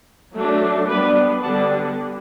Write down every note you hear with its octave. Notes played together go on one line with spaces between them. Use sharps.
F#3 A3 D4
G3 B3 D4 B4 D5
D3 G3 B3 D4 F#5 A5